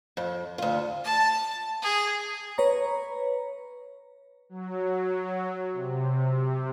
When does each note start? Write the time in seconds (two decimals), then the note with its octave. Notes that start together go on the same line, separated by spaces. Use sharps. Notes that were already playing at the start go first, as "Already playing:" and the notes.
0.17 F2
0.58 D2 F4
1.04 A5
1.82 G#4
2.58 B4 C#5 A#5
4.49 F#3
5.73 C3